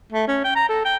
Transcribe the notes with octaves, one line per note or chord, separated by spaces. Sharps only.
A3
C#4
G5
A#5
A4
G5